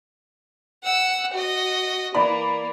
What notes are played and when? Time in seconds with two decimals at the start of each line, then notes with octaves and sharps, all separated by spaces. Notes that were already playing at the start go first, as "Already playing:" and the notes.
0.83 F#5 E6
1.34 F#4 D#5
2.15 E3 A#3 D5 B5